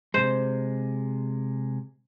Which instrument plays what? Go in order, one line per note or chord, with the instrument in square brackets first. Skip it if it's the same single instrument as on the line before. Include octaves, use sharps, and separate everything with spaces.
[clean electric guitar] C3 G#3 [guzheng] C5